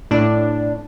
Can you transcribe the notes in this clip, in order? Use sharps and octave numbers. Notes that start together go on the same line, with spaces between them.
A2 D4